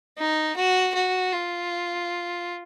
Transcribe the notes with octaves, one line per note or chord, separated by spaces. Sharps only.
D#4
F#4
F#4
F4